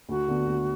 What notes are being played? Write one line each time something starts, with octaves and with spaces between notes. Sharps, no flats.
D2 F#4
D3 B3
D2